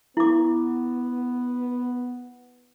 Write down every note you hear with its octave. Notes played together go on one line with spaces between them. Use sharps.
B3 E4 D6